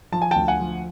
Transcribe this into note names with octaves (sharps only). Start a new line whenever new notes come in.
F3 A5
G#5
D2 G5 A5
F#5 G#5
F3